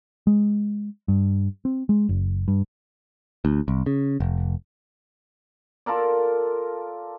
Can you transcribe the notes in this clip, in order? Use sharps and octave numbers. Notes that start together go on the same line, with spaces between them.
G#3
G2
C4
G#3
F#1
G2
D2
C2
C#3
F1
F4 A4 A#4 D5